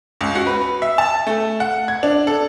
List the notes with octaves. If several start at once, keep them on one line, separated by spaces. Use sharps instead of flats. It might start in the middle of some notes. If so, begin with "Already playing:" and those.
C#2
F#4
B4
E5
A5
A3
F#5
G#6
D4
A4